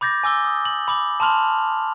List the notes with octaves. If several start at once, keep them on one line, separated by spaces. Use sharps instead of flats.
B5 D6 G6 A6 A#6
G#5 D6 E6 G7
D#6
F#7
B5 D6 F#7
A5 B5 C6 F6 F7 F#7